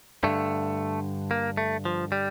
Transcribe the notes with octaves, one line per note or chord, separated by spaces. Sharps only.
G2 D3 A3
A#3
A3
F3
G3